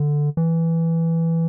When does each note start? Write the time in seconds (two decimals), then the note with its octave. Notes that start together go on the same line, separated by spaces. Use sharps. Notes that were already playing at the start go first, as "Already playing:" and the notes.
Already playing: D3
0.37 E3